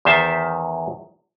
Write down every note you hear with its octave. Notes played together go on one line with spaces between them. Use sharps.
E2 D#3 C5 E5 A5